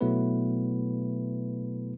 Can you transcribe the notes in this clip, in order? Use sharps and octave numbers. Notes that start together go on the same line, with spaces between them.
B2 F#3 A3 B3 E4 B4